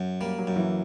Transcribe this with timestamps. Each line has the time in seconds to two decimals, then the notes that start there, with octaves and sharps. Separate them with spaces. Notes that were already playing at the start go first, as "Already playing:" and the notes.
Already playing: F#2
0.21 G3 A#3
0.39 F#3
0.47 F#2
0.56 E3